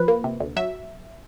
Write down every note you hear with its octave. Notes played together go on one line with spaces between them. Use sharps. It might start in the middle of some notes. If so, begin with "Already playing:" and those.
Already playing: F3 B4
A#3
C3
D2
F#3 E5